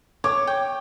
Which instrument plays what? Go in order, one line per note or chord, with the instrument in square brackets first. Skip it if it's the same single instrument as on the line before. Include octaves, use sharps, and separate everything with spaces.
[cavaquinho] C#5 [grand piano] D6
[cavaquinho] G5